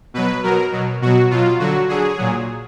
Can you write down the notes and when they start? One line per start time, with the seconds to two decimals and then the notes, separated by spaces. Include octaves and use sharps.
0.14 B2 F#3 B4
0.44 B2 F#3 A#4
0.72 B2 F#3
1.02 B2 F#3 F#4
1.30 B2 F#3 F4
1.59 D3 F#3 F#4
1.89 D3 F#3 G#4
2.18 A#2 F#3